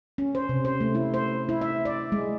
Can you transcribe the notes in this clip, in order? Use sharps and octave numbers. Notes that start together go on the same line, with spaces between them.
C#4
C5
C3
C5
A3
E4
C5
E4
E5
D5
G#3